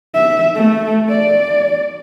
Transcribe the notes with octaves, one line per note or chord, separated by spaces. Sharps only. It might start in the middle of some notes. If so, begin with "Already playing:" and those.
E5
A3
D5